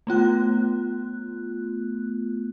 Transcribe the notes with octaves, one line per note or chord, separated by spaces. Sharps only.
A3 B3 F4 F#6